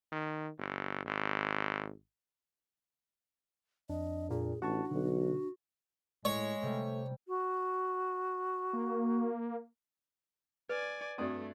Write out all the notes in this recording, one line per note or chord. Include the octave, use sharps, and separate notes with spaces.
D#3
G1
G#1
F2 D4 D#5
A#2 G#4
A1 D4 F#4 F#5 A5 C#6
B1 B2 D3
A2 G#3 C#5
C3 G3 A3
F#4
A#3
B4 D5 G#5
G2 A3 C4 F#4 A4 D5 D#6